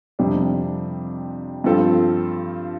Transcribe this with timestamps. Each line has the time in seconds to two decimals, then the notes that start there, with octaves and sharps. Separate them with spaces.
0.19 F2 C3 G3 D4
1.64 G2 F3 C4 F4 A4